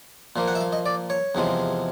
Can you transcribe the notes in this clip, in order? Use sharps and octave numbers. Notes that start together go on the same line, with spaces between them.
A#2 F3 A#3
F#5
E5
F5
D#5
D5
C#5
E2 C3 F3 G#3